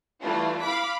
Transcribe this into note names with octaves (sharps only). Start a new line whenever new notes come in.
E3 G3 A3 F4
F5 B5 D6 B6